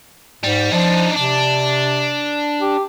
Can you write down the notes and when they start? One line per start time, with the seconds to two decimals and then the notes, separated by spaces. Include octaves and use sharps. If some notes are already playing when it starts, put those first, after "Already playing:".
0.43 G#2 G3
0.72 F3 D4 D#4
1.16 C3 D4
2.61 G4